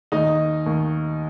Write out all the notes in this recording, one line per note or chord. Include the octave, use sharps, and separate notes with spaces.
D#2 D#3 D#4 D#5
D#2 D#3